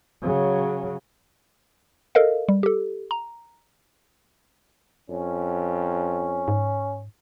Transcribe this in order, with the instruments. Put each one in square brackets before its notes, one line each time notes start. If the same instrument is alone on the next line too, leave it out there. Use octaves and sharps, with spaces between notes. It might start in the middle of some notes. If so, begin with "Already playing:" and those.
[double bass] C#3 F#3
[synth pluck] A4 A#4 D#5 F5
G3
G4 A4
A#5
[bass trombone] F2 [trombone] C#4
[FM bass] G#2